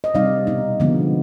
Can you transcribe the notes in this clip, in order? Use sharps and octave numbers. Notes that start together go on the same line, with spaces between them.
D#5
C3 G3 C4 D#4 D5 F5
B2 B3 D#4
D3 F3 G#3 B3